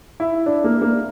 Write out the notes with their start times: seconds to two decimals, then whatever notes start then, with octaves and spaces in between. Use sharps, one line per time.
0.20 E4
0.46 D4
0.64 A#3
0.82 A#3